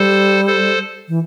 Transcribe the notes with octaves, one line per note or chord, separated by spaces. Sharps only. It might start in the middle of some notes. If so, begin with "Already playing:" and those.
Already playing: G3 A4 C5
A4 C5
E3